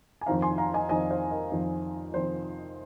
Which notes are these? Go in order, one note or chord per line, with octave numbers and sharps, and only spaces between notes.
G#5
F2 D#3 C4 F5 A#5
G#5 C6
F5 A#5
D#5 G#5
F2 D#3 C4 D#5 G#5
C5 F5
A#4 D#5
F2 D#3 C4
F2 D#3 C4 C5